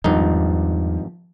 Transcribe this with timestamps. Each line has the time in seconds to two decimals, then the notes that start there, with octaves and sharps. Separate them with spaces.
0.04 G#1 E2 G2 D#3 F3 G3 D#4